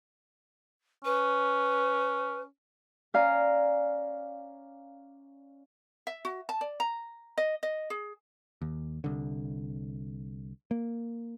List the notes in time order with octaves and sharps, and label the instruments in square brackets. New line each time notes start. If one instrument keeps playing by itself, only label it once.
[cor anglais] C#4 [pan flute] B4
[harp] C#4 D5 F5 G#5 A#5
[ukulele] E5
F#4
A5
D5
A#5
D#5
D#5
G#4
[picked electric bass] D#2
C2 D3
A#3